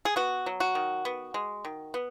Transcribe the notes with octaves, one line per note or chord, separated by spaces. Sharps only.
G#4
B3 F#4
F#3
F#4
D#3
B3
G#3
D#3
B3